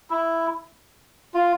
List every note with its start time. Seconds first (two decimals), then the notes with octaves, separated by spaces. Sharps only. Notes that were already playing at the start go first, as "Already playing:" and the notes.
0.10 E4
1.34 F4